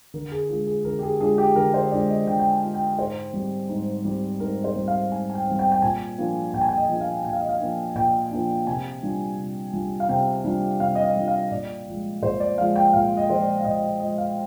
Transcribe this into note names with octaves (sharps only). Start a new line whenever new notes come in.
D3 A#4
G#4
G#3 D4 F4 G#4
G#4
D3 A#4
G4
G#4
G#3 D4 F4 G#4
G4
D3 A#4
C5
G#3 D4 F4 D5
D#5
D3 G5
G5
G#5
G#3 D4 F4
G5
G#2 C5
G3 C4
G#2
G3 C4
G#2 A#4
C5
G3 C4
F5
G#2 G#5
G#5
G5
G3 C4
G5
G5
A#2 G#5
F3 A#3 D4
A#2 G5
G#5
G5
D#5
F3 A#3 D4
F5
A#2 G5
F5
D#5
F5
F3 A#3 D4
A#2 G5
F3 A#3 D4
C3 G#5
G3 D4 F4
C3
G3 D4 F4
F5
C3 G5
G3 D4 F4
C3 F5
D#5
F5
G3 D4 F4
F5
A#2 D5
F3 G#3
A#2 C5
D5
F3 G#3 F5
G5
A#2 F5
D#5
F3 G#3 C5
D5
F5
A#2 D#5
D#5
F3 G#3 D#5
F5